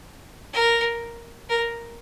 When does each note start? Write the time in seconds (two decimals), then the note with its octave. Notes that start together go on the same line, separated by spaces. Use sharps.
0.53 A#4
1.49 A#4